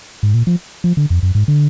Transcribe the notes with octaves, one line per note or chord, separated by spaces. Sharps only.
G#2
A#2
F3
F3
D3
F2
F#2
G#2
D3